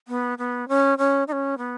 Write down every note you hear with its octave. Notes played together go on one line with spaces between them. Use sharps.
B3
B3
C#4
C#4
D#4
C#4
B3